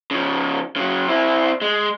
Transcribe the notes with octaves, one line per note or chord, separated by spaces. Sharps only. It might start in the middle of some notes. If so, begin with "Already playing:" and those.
C#3 F3
C#3 F#3
C4 E4
G#3